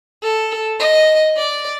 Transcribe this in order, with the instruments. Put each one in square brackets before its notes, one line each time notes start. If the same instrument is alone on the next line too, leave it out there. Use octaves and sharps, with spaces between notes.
[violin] A4
D#5
D5